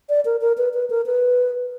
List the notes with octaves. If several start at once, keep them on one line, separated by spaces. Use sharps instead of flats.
D5
A#4
A#4
B4
B4
A#4
B4